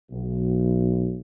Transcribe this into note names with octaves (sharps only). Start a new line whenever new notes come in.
B1